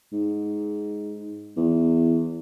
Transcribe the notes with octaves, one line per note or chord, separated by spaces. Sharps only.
G#2
E2